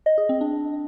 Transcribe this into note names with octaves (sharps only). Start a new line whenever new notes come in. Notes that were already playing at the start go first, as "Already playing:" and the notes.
D#5
G#4
C4
D4